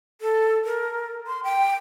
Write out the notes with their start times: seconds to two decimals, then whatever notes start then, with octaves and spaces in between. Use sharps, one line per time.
0.21 A4
0.64 A#4
1.27 C6
1.44 G5